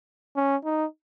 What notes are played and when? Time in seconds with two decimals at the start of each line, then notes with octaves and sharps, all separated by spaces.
0.36 C#4
0.65 D#4